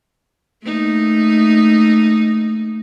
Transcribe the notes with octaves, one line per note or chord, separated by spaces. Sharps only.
A3 A#3 D#4